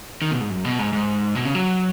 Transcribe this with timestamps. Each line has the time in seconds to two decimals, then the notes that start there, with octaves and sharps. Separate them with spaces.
0.22 D#3
0.31 B2
0.41 G#2
0.50 F#2
0.65 B2
0.79 G#2
0.93 G#2
1.35 B2
1.45 C#3
1.55 F#3